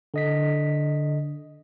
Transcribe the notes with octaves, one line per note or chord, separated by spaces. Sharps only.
D3 D#5 B6